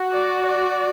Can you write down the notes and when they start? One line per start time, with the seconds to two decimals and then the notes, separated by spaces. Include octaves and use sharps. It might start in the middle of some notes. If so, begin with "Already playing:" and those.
Already playing: F#4
0.12 D5
0.46 D5